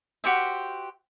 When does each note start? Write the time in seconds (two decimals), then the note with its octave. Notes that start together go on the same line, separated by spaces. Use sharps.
0.24 F#4 G4 C5 E5